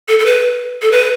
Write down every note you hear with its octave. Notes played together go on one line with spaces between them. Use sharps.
A4
A4
B4
A4
B4